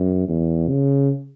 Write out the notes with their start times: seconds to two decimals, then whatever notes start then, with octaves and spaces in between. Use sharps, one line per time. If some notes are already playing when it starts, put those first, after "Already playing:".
Already playing: F#2
0.29 E2
0.69 C#3